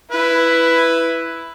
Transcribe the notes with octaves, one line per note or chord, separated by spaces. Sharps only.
E4 B4